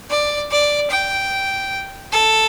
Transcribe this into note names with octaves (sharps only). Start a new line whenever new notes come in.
D5
D5
G5
A4